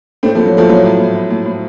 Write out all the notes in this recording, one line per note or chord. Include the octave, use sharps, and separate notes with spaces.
A2 A3 C4
F3 A3
A2
F#3
A2 F3 A3
A2 F#3
A2
A2
A2
A2
A2